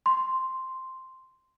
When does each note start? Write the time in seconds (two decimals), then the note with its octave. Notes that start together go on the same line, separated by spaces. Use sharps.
0.06 C6